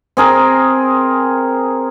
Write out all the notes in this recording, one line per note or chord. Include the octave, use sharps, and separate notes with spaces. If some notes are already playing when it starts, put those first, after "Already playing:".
C4 G#4 A#4